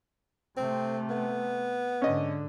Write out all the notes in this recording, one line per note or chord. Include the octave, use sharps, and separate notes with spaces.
C3 A3 C4
B3
G#2 D3 C#4 D#5